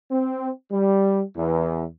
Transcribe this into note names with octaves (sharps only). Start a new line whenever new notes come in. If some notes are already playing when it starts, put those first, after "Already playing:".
C4
G3
E2